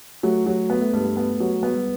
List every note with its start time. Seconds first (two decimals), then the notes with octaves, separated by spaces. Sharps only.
0.23 F#3 A3
0.46 F#3
0.70 B3
0.81 A3
0.93 G2 G#3
1.17 B3
1.40 F#3
1.63 G#3 B3
1.75 G3